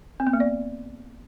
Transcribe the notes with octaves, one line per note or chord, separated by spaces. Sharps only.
C4
B3
A#3
D5